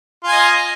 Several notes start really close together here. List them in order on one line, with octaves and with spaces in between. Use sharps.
F4 G#5 D#5